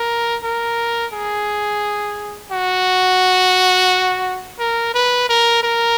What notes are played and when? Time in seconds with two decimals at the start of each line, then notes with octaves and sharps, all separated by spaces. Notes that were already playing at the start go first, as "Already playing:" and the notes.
Already playing: A#4
0.44 A#4
1.13 G#4
2.52 F#4
4.59 A#4
4.94 B4
5.29 A#4
5.63 A#4